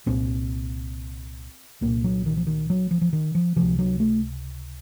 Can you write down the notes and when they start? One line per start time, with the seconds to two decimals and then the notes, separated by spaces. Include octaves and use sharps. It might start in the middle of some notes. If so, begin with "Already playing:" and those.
0.06 C2 A#2 C4
1.81 C2 A#2 A#3
2.04 F#3
2.26 D#3
2.37 F3
2.47 D#3
2.70 F#3
2.91 F3
3.01 F3
3.13 D#3
3.35 F3
3.56 C3 F3
3.61 C#2
3.79 F#3
4.00 A3